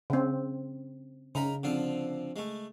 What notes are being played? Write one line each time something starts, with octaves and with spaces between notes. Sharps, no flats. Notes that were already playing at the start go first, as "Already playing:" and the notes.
C#3 C4
C#3 D#4 A#4 B5
D3 F3 C4
G#3 A3